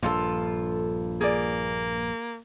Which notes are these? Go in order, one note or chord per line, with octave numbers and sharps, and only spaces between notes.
A#1 G2 F4 A4
A#3 G#4 D5